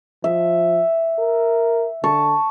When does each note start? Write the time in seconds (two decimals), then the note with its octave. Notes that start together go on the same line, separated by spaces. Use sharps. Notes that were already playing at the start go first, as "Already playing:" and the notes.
0.24 F3 E5
1.19 A#4
2.04 D3 A5 C#6